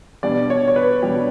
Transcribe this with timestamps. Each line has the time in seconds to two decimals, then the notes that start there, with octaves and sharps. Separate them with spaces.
0.23 B2 G3 D4 D5
0.50 C#5
0.68 C#5
0.76 B4
1.02 B2 G3 D4 G4